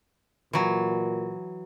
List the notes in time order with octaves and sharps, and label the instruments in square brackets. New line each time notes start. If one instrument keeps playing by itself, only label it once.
[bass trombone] A#2 [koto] E3 F#3